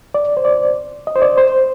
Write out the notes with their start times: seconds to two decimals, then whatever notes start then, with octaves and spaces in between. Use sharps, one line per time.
0.15 D5
0.37 C5
0.45 D5
1.07 D#5
1.16 C5
1.22 D5
1.37 C5